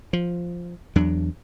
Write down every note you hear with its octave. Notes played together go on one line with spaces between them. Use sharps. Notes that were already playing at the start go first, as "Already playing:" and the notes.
F3
E2 F#3 D4